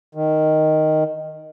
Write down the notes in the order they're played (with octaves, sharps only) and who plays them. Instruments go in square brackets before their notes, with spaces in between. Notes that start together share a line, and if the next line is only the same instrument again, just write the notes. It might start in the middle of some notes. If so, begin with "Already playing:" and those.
[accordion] D#3